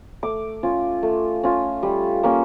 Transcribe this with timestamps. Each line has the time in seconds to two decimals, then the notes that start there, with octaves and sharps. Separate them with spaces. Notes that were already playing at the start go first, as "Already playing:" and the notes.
0.23 A3 D6
0.63 C#4 F4
1.03 A3
1.43 C#4 F4
1.83 G3
2.23 A#3 C#4